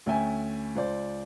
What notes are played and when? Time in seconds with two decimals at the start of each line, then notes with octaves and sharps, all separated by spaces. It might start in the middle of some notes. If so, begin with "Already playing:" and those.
0.06 D2 A3 C#4 E5 G5 G#5
0.75 C#2 C5 D5